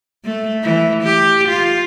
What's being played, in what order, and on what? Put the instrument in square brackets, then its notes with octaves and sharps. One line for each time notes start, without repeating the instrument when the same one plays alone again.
[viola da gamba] A3
E3
G4
F4